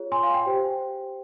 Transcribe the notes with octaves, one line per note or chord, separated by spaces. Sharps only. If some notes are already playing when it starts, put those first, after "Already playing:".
Already playing: F4 G#4 C#5
G#5 C6
F5
G5
G4 C5